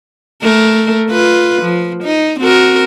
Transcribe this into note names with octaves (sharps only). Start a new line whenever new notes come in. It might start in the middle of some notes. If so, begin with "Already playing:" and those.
A3 A#4
F4 B4
F3
D#4
C4 F#4 A#4